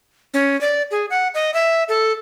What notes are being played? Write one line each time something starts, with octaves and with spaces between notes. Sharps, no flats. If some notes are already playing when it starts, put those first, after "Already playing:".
C#4
D5
G#4
F#5
D#5
E5
A4